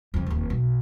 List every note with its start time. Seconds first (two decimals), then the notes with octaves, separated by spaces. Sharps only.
0.14 F2 C#3
0.27 F1 D#2
0.50 B1